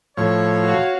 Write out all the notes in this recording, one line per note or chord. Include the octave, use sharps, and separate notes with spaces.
A2 F3 C#5
F#4 F5